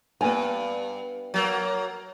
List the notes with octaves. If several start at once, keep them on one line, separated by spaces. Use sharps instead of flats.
G2 B3 G#5
F#3 A#3